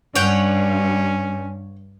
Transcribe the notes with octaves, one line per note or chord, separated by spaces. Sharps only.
G2 C#4 C#5 F#5 G5